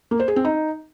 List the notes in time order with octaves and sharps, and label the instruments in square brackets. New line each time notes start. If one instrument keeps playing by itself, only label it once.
[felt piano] A#3
C5
G#4
C4
D#4